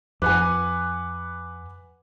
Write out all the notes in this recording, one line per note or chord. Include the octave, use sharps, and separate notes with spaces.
F2 B4 F#5 G#5 D6 F#6